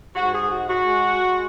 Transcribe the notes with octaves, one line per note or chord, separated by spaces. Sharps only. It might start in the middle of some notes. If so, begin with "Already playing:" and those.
G#2 F#4
G#4
G#3 F#4
F#4
G#3
G#3